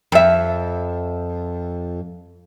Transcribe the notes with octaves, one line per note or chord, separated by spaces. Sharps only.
F2 E5